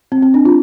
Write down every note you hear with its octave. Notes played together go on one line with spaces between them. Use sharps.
C4
C4
D4
F4